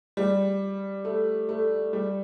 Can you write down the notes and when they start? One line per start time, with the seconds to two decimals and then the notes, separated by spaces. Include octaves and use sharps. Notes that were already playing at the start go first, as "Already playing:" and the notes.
0.17 G3
1.05 A3
1.49 A3
1.93 G3